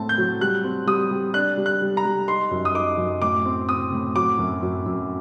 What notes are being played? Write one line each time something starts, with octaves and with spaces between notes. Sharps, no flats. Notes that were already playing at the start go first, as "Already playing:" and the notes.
Already playing: A2 A3 C4 A5
G6
F#3
G3 F#6
C4
G3 D#6
G3
D4 F#6
G3
F#6
G3
A#5
G3
D#4 C6
F#2
D#6
D#4 D6
F#2
A2 D6
C4
C4 D#6
A2
F#3 D6
F#2
F#2
F#2